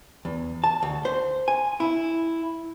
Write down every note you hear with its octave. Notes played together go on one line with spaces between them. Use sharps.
E2
A5
D2
C5
G#5
E4